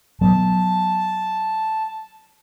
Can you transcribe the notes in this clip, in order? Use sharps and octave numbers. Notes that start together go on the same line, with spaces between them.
F#3 B3 A5